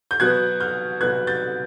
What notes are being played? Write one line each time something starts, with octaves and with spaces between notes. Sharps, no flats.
G6
B2 F#3 B3 F#6 G#6
F6 G6
B2 F#3 B3 F#6 G#6
G6 A6